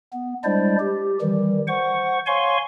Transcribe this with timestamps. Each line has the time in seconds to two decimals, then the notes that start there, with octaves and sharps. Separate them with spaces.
0.13 B3
0.44 G3 G#3 D4 E4 C5 D5
0.80 G4
1.21 D#3 E3 G3
1.68 C5 F#5 C#6
2.27 C#5 F5 G#5 C6 C#6